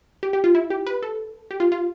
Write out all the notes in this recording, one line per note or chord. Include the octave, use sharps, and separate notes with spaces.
G4
G4
F4
E4
G4
B4
A4
G4
F4
F4